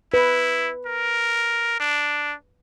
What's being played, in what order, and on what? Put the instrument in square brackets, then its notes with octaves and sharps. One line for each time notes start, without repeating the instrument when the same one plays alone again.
[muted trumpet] E4 [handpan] B4
[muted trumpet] A#4
D4